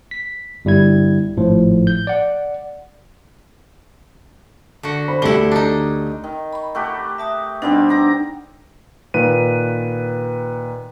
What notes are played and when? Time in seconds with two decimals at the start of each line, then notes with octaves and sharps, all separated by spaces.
0.11 B6
0.65 G1 G3 E4 G#6
1.37 G#1 A2 F3
1.87 G6
2.07 D5 F#5
4.83 D3 F#4
5.08 C5 B5
5.22 D2 D3 E4 G4 G7
5.51 D4 D#4
6.24 D#3
6.53 B5 C#6
6.75 A3 F#4 G4
7.18 E5 A5 D#6
7.62 B2 G3 C4 D4 D#4 F#5
7.89 G4 A#5 D6
9.14 A#2 D#3 B4 D#7